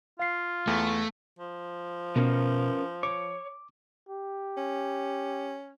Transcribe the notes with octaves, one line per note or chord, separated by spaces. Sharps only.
F4 F5 C7
E2 A3
F3
B2 C#4 A#4 B4
C#5 D6
G4
C#4